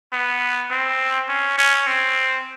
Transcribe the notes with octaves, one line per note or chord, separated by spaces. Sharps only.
B3
C4
C#4
C#4
C4